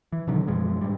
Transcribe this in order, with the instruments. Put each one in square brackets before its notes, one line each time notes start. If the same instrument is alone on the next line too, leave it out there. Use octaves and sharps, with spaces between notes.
[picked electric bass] E3
B2 D3 D#3 F#3
F#2 B2 F3 G#3
G#2 G3